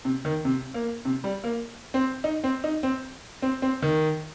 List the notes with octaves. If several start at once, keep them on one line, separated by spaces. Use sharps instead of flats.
C3
D#3
C3
A#3
C3
G3
A#3
C4
D#4
C4
D#4
C4
C4
C4
D#3